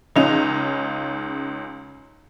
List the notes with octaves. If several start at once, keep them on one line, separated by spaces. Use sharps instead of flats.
C#2 C#3 C#4 D#4 F7